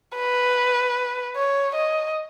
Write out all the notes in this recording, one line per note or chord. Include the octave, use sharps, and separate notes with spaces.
B4
C#5
D#5